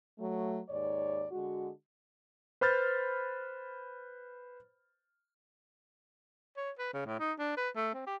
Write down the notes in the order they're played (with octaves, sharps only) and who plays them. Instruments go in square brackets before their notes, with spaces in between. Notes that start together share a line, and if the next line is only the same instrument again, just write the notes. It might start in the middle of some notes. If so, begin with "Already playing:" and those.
[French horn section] F#3 A3
D#2 G#2 C#5 D5
D3 G#3 F#4
[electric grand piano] B4 C5 B5 F6 G6 A6
[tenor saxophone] C#5
B4
C#3
A2
D#4
D4
B4
A3
C4
G4